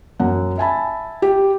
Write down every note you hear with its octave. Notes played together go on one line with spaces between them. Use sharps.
F#2 F#5
E5 G#5 A5 B5
G4